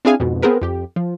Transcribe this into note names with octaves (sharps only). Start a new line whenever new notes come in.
C4 D4 E4 G#4 F5 G#5
F2 G#2 B2
B3 C4 G#4 A#4 B4
F2 G4
F3